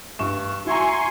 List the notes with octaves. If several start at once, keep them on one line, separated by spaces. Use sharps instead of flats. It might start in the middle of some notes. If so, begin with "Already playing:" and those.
G2 C#6 E7
E4 F#4 G#5 A#5 C6 C#6